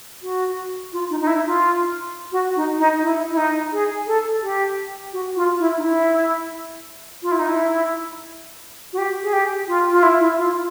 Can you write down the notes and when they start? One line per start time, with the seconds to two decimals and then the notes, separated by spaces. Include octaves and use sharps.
0.22 F#4
0.93 F4
1.10 D#4
1.21 D#4
1.27 E4
1.44 F4
2.32 F#4
2.56 D#4
2.79 D#4
3.03 E4
3.31 E4
3.37 D#4
3.72 G#4
4.07 A4
4.42 G4
5.13 F#4
5.36 F4
5.59 E4
5.77 D#4
5.82 E4
7.22 F4
7.32 E4
7.39 D#4
7.48 E4
8.93 F#4
8.98 G4
9.23 G#4
9.33 G4
9.67 F4
9.92 F4
10.03 E4
10.20 E4
10.37 F4